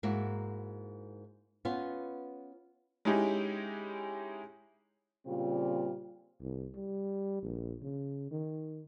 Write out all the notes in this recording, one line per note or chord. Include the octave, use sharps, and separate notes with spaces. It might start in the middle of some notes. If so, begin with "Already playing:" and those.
G#2 A#3 E4 F#4
B3 C#4 F4
G#3 C#4 D#4 E4 G4 G#4
A#2 C#3 G3 C4 F4
C2
G3
A#1
C#3
D#3